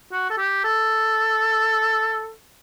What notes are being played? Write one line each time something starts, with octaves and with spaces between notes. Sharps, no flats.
F#4
A4
G4
A4